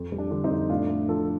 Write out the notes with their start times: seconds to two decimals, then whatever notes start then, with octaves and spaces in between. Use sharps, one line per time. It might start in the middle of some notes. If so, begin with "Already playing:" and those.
Already playing: F2
0.12 G3
0.18 D4
0.31 D3
0.44 C4 D#4
0.51 F2
0.70 A2 D4 F4
0.89 A3
1.08 F3 F4 A4